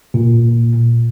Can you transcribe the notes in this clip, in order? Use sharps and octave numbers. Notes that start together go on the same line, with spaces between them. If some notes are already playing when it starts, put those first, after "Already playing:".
A#2